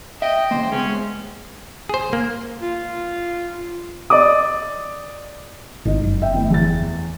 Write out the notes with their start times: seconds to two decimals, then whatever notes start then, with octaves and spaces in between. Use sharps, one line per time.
0.22 D#5 E5 G5
0.51 C#3 E3 A#3 C5 G5
0.72 G#3 B3 C#4 C5
1.89 G#4 C5
2.13 A#3
2.62 F4
4.10 D5 D#5 D6 D#6
5.85 G#1 D#4 D#5
6.04 F#1
6.22 E5 G5
6.34 A2 E3
6.50 E2 A6